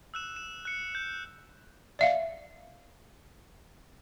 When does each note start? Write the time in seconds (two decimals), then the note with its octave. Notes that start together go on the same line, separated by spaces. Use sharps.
0.14 E6 F#6 E7
0.36 E7
0.65 F#6 C#7
0.95 G6
1.99 D5 E5 F5